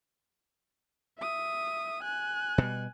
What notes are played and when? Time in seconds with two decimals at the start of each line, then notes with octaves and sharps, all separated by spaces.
1.19 E5 D#6
2.03 G#5 F#6
2.58 B2 G3